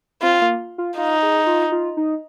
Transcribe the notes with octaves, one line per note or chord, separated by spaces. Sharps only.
C4 F4
A#3
F4
D#4 F4
G#4
F4
F4
D#4